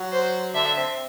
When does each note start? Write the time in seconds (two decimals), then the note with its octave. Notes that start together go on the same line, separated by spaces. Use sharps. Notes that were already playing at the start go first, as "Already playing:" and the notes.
Already playing: F#3 F#4
0.12 C5
0.54 D3 D4 E5
0.77 C4